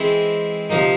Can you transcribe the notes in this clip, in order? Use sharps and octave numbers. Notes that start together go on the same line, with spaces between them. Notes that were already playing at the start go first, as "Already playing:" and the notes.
Already playing: E3 G#3 C4 E4
C3 F3 A#3 D#4